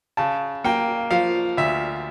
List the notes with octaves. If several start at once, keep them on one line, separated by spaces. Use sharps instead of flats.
C#3 A5
A#3 G5
F3 F5
D2 E5